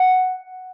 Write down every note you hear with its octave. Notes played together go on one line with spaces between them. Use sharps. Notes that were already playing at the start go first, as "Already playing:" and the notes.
Already playing: F#5